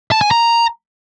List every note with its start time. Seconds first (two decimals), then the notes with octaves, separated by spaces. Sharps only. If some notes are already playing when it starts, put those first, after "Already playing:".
0.12 A5
0.21 G#5
0.31 A#5